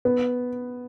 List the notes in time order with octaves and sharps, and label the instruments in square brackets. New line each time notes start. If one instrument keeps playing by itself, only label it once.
[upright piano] B3